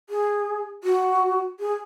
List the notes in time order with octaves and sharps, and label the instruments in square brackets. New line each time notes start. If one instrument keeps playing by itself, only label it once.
[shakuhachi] G#4
F#4
G#4